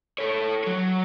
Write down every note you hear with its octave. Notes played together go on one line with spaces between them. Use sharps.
A4 C#5
F#3 C#5